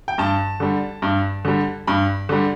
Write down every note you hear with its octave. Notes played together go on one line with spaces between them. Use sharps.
G5
G2 A5
D3 G3
G2
D3 G3
G2 B5
D3 G3